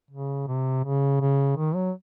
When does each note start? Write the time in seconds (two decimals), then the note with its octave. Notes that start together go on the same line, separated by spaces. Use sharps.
0.11 C#3
0.47 C3
0.84 C#3
1.21 C#3
1.57 D#3
1.75 F#3